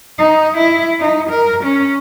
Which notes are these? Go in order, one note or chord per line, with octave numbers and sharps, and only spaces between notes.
D#4
E4
D#4
A#4
C#4